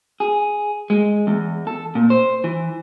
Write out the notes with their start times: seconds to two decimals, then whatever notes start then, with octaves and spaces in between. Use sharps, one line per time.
0.20 G#4
0.90 G#3
1.27 E2
1.67 A4
1.95 A#2
2.10 C5
2.44 E3